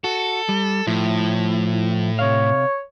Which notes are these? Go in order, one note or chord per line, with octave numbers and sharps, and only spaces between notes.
F#4 A4
G3
A2 F3 E4
C3 C#5 F5